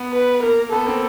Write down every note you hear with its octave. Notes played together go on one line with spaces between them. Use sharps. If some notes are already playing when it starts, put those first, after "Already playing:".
Already playing: B3
B4
A#3 A#4
B3 A4
A#3 C4